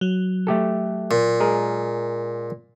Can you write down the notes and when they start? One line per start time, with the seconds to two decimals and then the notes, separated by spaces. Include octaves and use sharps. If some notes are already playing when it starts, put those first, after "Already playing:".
0.01 F#3
0.47 A3 G4 A4
1.11 A#2
1.40 G#3 G#4 A#4